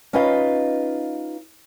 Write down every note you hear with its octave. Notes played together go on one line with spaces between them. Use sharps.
C#4 D#4 F4 B4 D#5 F5